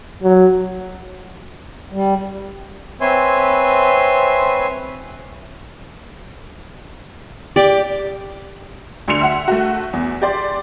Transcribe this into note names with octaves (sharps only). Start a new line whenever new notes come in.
F#3
G3
C4 B4 C#5 E5 G#5 C6
G4 D5
D2 D3 C6 C#7 F7
E5 F#5
A3 F#4
E2
G4 D5 C6